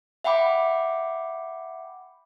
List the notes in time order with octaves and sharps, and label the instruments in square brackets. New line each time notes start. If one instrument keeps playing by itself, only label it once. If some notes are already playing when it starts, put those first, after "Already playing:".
[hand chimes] E5 F#5 G5 B5 D6